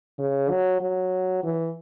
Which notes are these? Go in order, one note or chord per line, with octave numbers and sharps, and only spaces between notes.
C#3
F#3
F#3
E3